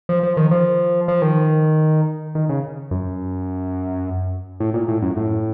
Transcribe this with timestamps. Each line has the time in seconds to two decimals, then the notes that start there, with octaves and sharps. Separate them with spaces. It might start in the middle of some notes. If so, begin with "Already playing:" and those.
0.09 F3
0.23 F3
0.37 D#3
0.51 F3
1.08 F3
1.22 D#3
2.35 D#3
2.49 C#3
2.91 F#2
4.60 A2
4.74 A#2
4.88 A2
5.02 F#2
5.17 A2